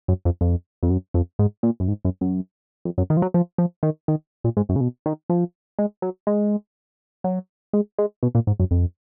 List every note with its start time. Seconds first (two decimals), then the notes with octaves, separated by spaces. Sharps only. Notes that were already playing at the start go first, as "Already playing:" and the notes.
0.08 F#2
0.25 F2
0.41 F2
0.83 F2
0.90 F#2
1.14 F2
1.39 G#2
1.63 A#2
1.80 F#2
1.88 G#2
2.05 F#2
2.21 F#2
2.85 F2
2.98 F#2
3.10 D#3
3.17 F3
3.22 F#3
3.34 F3
3.58 F3
3.83 D#3
4.08 D#3
4.44 A#2
4.57 G#2
4.69 F#2
4.76 C#3
4.81 B2
5.06 D#3
5.30 F3
5.79 G#3
6.02 F#3
6.27 G#3
7.24 F#3
7.73 G#3
7.98 G#3
8.23 B2
8.35 A#2
8.47 G#2
8.60 F#2
8.71 F2